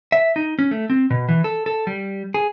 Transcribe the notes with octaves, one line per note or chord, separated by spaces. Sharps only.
E5
D#4
C#4
A3
C4
B2
E3
A4
A4
G3
G#4